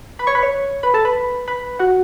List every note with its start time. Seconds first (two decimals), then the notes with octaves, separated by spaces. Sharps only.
0.19 B4 B5
0.27 C#5 C#6
0.35 B4 B5
0.43 C#5 C#6
0.83 B4 B5
0.94 A4 A5
1.05 B4 B5
1.48 B4 B5
1.79 F#4 F#5